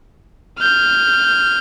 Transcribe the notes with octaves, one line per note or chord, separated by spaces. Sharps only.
F6 G6